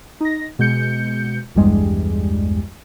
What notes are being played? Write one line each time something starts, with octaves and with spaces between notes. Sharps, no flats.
D#4 A#6
B2 G#3 G6 C#7
A#1 E2 G2 G3 G#3